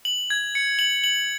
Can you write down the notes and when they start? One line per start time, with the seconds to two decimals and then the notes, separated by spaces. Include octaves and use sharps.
0.05 F#7
0.30 G#6
0.55 C#7
0.79 F#7
1.04 F#7